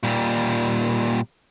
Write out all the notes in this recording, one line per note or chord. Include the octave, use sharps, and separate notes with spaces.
A#2 G3